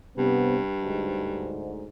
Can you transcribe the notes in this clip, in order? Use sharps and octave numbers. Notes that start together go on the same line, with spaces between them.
G2 C3 B3
D2 G#2